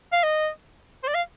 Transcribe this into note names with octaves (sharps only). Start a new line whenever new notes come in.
F5
D#5
C5
D5
F5